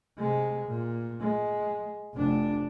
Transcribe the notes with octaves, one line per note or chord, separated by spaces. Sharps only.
C3 G#3
A#2
G#3
F1 D4